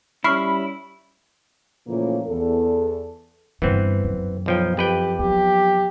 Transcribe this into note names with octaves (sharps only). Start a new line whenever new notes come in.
G3 C#4 E4 B5 C#6 F6 C7
A#2 C#3 E3 F3 A3 A#3
E2 A4
G2 D3 E3 B3 C4
F#2
B1 F3 G5
F2 G4 B4 G5
F#3 B3 G4